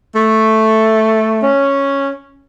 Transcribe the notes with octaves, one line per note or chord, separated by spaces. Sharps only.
A3
C#4